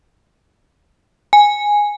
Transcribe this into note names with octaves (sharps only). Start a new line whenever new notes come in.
G#5